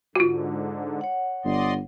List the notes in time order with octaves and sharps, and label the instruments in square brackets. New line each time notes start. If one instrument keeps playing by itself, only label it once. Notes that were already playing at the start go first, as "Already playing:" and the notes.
[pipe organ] G#2 D3 [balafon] F4 F#4
[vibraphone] C#5 F#5
[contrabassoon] G1 [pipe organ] D5 D#5 C6